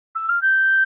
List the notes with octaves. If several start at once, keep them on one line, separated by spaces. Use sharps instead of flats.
E6
F6
G6